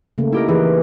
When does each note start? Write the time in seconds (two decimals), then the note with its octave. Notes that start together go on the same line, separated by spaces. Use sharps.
0.18 C#3 A3 A#3
0.32 D#4 E4 G4 A#4
0.48 E3 D#4 G#4 B4